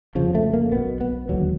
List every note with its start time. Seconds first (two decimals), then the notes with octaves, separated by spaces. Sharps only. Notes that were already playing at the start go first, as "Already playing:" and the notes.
0.15 G1 F2 C#3 F3
0.35 A3
0.53 A#3
0.72 B1 B2 B3
1.01 B3
1.29 E1 D#2 D3 F#3